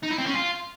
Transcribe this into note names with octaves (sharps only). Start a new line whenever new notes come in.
D#4
E4
C4
C#4
F4